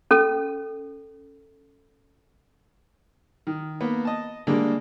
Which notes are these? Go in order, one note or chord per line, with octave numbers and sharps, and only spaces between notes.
C#4 A4
D#3
A#3 B3
D#5 A5
D3 G3 G#3 A#3 D4